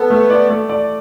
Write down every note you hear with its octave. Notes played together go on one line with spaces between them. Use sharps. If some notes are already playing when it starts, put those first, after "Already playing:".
Already playing: B3 A4
A3
D5
A3
D5